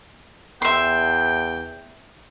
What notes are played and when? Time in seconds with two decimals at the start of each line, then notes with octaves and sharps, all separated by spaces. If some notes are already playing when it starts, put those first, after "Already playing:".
0.62 E2 E5 G5 C6